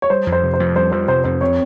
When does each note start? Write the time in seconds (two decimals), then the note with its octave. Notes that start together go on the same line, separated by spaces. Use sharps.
0.02 C#5
0.10 G3 C5
0.27 F2
0.32 C5
0.43 C3
0.54 C5
0.60 F2
0.75 G3 C5
0.92 F2 C5
1.08 C3 C5
1.24 F2 C5
1.41 C4 C#5